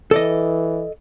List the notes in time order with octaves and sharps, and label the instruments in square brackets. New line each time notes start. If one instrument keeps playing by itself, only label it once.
[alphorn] E3 [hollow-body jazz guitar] A4 D5 D#5